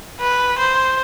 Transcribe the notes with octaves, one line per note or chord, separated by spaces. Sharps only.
B4
C5